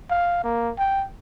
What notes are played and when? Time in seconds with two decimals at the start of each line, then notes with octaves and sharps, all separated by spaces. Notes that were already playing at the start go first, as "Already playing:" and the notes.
0.10 F5
0.44 A#3
0.78 G5